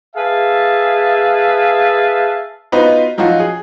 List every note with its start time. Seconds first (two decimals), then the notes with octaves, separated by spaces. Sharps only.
0.16 G#4 B4 E5 F5 A5
2.72 B3 D#4 F4 F#4 B4 C5
3.18 F3 F#3 D#4 F4 F#4
3.39 G#4